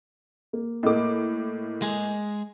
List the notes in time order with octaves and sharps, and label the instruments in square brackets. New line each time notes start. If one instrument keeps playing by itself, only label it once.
[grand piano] A#3
[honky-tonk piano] A2 D6 [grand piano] A#3 D#5
[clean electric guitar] G#3 G#4